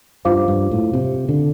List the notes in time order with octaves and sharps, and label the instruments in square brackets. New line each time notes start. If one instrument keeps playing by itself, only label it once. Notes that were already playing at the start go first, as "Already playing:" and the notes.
[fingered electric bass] G2 [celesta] F4 C5 F5 D6
[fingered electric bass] G2
A2
C3
D3